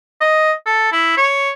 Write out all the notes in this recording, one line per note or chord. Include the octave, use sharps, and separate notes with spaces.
D#5
A4
E4
C#5